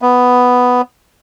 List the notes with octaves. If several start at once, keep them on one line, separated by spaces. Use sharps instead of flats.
B3